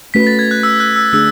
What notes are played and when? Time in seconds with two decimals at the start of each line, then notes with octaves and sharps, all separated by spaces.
0.14 A3 C#4 F#4 B4 B6
0.27 A6
0.39 G#6
0.51 F#6
0.63 E6
0.80 F#6
0.96 E6
1.13 D3 A3 D4 G#4 E6